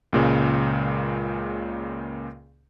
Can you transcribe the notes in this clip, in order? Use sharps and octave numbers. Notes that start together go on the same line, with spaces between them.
C#2 A#2 C#3 G#3